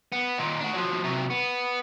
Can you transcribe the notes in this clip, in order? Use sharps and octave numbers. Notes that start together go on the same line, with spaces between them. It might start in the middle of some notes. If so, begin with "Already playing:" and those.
B3
D#2 A#2
D4 F#4
F3 F#3
C3 F#3
B3